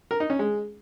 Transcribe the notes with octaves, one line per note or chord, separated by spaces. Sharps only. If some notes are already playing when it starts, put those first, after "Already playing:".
A#4
D#4
C#4
G#3